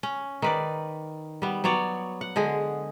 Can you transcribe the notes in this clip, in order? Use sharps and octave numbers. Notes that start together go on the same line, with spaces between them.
C#4
D#3 B4 D5
G3 B3
F#3 B3 C#5 D5
F#5
D3 G#3 G#4